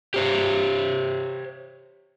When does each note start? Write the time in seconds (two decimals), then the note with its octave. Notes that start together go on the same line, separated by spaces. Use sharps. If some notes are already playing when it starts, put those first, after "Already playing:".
0.14 G4 C5 C#5